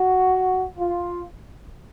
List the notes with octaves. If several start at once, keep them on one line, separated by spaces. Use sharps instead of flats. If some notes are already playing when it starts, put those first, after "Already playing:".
Already playing: F#4
F4